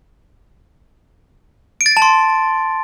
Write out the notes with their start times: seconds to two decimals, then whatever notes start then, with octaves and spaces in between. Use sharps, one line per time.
1.81 D7
1.86 A6
1.91 D7
1.97 A5
2.02 C6